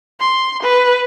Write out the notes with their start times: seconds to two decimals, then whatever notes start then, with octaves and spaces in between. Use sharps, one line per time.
0.20 C6
0.62 B4